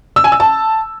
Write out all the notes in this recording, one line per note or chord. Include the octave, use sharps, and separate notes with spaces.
E6
G#5
E6
A5